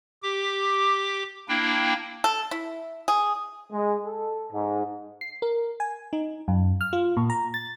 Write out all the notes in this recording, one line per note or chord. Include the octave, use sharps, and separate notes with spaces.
G4 D6
A#3 D4 E4 G5
A4
E4
G#4
G#3
A4
G#2
C7
A#4
G#5
D#4
F#2
F6
F4
A#2
A#5
A6